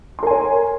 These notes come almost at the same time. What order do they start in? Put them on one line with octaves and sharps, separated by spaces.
C6 A#4 G#5 C#5